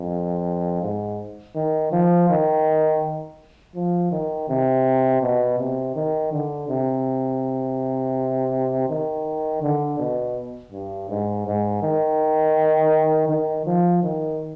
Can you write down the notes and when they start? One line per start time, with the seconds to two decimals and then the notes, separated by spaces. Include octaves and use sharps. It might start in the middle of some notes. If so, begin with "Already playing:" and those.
Already playing: F2
0.82 G#2
1.55 D#3
1.92 F3
2.30 D#3
3.75 F3
4.12 D#3
4.49 C3
5.22 B2
5.59 C3
5.95 D#3
6.32 D3
6.69 C3
8.89 D#3
9.62 D3
9.99 B2
10.72 G2
11.09 G#2
11.46 G#2
11.82 D#3
13.29 D#3
13.66 F3
14.03 D#3